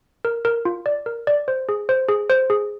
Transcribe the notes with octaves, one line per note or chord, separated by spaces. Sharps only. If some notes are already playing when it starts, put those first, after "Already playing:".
A#4
A#4
F4
D5
A#4
D5
C5
G#4
C5
G#4
C5
G#4